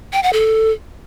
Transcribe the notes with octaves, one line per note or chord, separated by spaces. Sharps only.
G5
F#5
A4